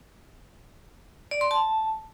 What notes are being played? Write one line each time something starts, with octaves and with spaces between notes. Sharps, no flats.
D5
C6
A5